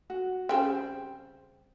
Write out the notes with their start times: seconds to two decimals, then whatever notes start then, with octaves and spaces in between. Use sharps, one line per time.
0.10 F#4
0.49 C#3 G3 C4 C5 G5